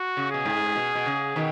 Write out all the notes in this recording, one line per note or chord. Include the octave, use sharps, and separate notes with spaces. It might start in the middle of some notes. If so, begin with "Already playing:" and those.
Already playing: F#4
C#3
B2 G#4
G#2
B2
B2
C#3
B2 D#3